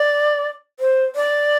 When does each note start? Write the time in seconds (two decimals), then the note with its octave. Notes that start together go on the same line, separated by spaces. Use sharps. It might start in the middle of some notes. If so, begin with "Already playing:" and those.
Already playing: D5
0.80 C5
1.16 D5